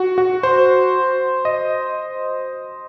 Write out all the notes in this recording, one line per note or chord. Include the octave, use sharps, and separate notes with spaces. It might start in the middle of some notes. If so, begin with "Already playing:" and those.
Already playing: F#4
F#4
C5
D#5